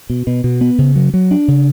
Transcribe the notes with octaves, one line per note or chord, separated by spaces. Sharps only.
B2
B2
B2
B3
C#3
F#3
F#3
D4
C#3